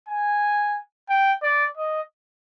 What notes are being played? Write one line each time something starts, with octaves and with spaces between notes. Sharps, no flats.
G#5
G5
D5
D#5